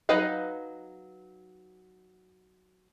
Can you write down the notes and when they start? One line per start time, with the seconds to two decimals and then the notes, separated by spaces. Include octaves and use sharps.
0.09 F#3 D#4 B4 D#5 F5